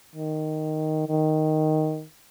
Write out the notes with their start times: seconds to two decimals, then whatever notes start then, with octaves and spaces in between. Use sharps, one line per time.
0.15 D#3
1.08 D#3